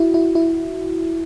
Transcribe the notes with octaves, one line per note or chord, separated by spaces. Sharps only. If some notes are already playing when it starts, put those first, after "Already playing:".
Already playing: E4 F#4
E4
E4